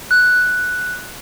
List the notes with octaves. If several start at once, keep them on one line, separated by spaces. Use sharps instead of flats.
F#6